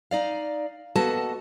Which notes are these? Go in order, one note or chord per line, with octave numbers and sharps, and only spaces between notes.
D#4 D5 F5
A#3 B3 F#4 A4 D#5 A5